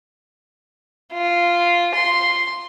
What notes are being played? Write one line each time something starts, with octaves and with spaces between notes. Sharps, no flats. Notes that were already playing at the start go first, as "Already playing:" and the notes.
F4
C6